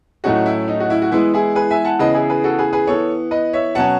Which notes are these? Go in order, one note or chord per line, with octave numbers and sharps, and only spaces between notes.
A2 F#3 A3 C#4 D#4 F#4
E4
D#4
F#4
E4
F#4
E3 G#3 B3 E4
E4 G#4
G#4 B4
E5 G#5
F#5 A5
C#3 E3 B3 B4 D#5
E4 G#4
G#4 B4
F#4 A4
G#4 B4
G#4 B4
E3 B3 A4 C#5
B4 D#5
C#5 E5
B2 F#3 C#4 F#5 A5